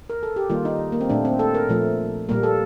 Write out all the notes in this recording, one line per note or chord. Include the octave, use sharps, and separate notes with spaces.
A#4
A4
G4
D#3 G3 A#3 F4
D#4
A#3
C4
A#2 A3 D4
C4
A4
A#4
A#2 F3 A3
A#2 G3 A#3 A#4
A4